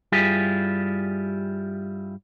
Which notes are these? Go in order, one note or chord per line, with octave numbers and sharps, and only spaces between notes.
G2 G3 E4 F4 G4 G#4